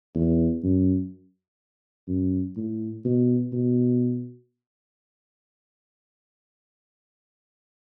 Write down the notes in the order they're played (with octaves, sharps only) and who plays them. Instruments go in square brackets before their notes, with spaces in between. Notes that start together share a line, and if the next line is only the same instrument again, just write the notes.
[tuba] E2
F#2
F#2
A2
B2
B2